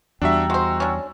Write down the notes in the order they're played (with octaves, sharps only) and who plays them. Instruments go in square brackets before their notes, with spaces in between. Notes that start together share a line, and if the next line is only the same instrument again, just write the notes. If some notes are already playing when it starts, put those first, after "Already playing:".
[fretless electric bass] E2 G3 [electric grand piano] D4 F#4 E5 [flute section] G5 A#5 E6
[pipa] G#3 C5 [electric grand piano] F#4
[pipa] C#4 D4